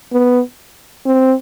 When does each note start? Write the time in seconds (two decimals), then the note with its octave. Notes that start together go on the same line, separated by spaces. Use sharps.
0.12 B3
1.06 C4